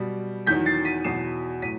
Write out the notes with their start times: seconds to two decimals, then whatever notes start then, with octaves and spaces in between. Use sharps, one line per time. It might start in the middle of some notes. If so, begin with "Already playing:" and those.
Already playing: B2 G3
0.47 E2 D#3 F#3 G6 B6
0.66 A6 C7
0.85 B6 D#7
1.04 E2 B2 F#3 C7 E7
1.62 A2 F#3 B6 D#7